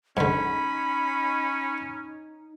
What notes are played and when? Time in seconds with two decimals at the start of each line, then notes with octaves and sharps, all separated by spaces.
0.17 G#2 D3 C#4 D#4 B5